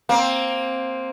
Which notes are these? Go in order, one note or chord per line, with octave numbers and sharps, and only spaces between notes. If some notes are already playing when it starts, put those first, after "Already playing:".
A#3 C4